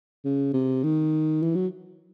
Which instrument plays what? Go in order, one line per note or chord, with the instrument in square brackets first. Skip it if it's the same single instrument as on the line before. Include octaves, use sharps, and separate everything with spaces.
[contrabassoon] C#3
C3
D#3
E3
F#3